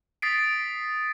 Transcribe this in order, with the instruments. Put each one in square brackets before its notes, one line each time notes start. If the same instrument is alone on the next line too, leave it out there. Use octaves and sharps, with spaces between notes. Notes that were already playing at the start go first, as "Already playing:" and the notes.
[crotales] D#6 A6 B6 C7 D7